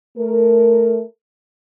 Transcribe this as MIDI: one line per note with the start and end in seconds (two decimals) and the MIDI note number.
0.17 1.02 57
0.17 1.02 70